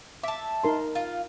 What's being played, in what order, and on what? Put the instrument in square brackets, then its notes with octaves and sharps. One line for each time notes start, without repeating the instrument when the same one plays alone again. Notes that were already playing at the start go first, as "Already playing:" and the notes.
[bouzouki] E5 A5 [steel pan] D6
[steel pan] D#4 A#4 C6
[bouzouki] F4